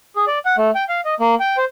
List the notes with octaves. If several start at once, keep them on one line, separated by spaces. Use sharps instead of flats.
G#4
D5
F#5
A3
G5
F5
D#5
A#3
G5
C5